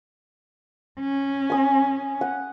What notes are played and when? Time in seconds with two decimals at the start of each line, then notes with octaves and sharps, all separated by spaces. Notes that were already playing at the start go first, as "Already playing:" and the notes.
1.00 C#4
1.50 G#5 D#6
2.21 F#5